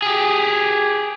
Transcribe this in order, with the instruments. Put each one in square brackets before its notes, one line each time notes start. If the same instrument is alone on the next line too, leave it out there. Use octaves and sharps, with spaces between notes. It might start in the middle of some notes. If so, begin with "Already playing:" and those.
[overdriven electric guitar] G4 G#4